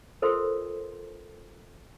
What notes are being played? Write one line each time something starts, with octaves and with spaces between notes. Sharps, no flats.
F4 A4 A#4 C5 D#5 C6